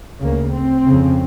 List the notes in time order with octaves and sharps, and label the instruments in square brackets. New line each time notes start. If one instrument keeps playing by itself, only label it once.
[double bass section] D2 C#3 A#3
C4
F2 C#3